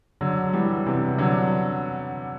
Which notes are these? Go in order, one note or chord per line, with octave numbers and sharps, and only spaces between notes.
D3 F#3
E3 G3
C3 E3
D3 F#3